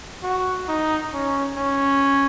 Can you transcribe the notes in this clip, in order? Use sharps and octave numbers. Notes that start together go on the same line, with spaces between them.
F#4
D#4
C#4
C#4